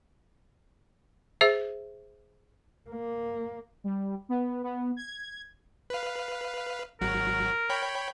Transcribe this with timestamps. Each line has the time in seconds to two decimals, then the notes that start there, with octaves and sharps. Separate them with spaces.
1.41 G#4 C5 E5
2.90 A#3
3.84 G3
4.29 B3
4.64 B3
4.97 G#6
5.90 B4 F5
7.01 G#1 F#3 F#4 A#4
7.70 C#5 G5 B5